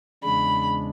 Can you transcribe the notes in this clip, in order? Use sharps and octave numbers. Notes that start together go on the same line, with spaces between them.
E2 C#3 G#3 D4 B5